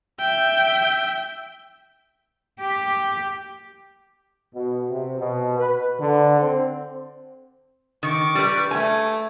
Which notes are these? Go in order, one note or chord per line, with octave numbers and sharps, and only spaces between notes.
E5 G5
G4
B2
C3
B2
B4
D3
C4
D#3 C#6 D6
G3 B4
A3 G#5